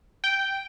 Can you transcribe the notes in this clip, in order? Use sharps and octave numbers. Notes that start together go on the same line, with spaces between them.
G5